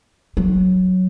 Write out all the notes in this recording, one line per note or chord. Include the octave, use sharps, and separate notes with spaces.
F#3